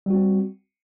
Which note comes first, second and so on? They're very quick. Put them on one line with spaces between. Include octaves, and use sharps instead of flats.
G3 F#4 C4